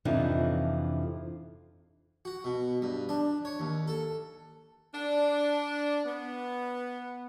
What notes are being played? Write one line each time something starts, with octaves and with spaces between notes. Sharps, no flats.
F2 C3 E3 F3 D4 D#4
F#4
B2
G2
D4
C#5
D#2
A4
D4
B3